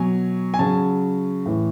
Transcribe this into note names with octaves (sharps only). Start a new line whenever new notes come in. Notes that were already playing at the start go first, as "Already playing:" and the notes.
Already playing: B2 F#3 G#5
G#5
C#3 F#3 A5
A2 E3